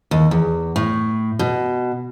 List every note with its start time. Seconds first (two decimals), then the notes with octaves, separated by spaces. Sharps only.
0.11 D#2
0.31 E2
0.76 A2
1.39 B2